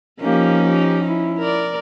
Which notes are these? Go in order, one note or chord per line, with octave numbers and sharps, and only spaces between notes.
F3 A#3 C#4 D#4 G4
G4
E4
A#4 D5